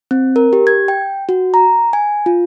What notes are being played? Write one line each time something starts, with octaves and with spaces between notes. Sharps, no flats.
C4
A#4
G4
G#6
G5
F#4
A#5
G#5
F4